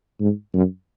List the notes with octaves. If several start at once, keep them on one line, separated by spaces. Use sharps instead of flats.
G#2
F#2